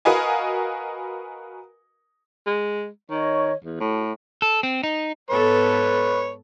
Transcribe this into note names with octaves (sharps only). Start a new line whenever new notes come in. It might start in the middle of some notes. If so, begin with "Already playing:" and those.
F#4 A#4 B4 D#5 F5 G#5
G#3
D#3 C#5 D#5 C#6
E2
A2 F#4 A4
A4
C4
D#4
G#2 B3 A4 B4 C#5